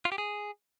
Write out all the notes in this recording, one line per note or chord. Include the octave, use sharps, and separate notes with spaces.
F4
G4
G#4